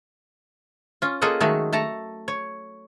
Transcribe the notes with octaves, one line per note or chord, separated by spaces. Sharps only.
C#4 F4
A#3 F4 G#4 A4 D#5 F#5
D#3 F#3 G#3 A3 A4
A3 A4 A5 A#5
C#5